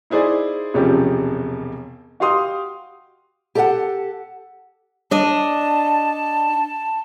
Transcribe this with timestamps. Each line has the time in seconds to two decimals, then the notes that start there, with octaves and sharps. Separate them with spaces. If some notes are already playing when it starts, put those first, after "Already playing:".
0.10 D#4 E4 G#4 C5 D5
0.74 E1 C#2 C3 F3 C#4 G4
2.20 F#4 G4 F5 C6 D#6
3.55 G4 A4 D#5 E5 F#5 A5
5.11 D4 D#5 A5